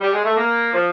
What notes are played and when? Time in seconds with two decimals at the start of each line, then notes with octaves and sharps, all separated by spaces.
0.01 G3
0.13 G#3
0.24 A3
0.37 A#3
0.73 F3